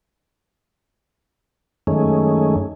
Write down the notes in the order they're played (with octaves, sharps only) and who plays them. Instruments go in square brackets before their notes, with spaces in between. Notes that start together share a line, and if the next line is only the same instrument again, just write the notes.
[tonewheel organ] F#2 D#3 G#3 A3 C#4